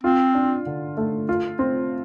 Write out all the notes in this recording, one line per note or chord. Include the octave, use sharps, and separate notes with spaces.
C4 F4
D4
D3
A3
F4
C4